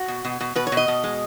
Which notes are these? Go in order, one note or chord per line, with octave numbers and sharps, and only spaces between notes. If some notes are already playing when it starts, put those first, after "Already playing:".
Already playing: F#4
B2
B2
B2
B2 B4
C#5
B2
D#5
B2
G#3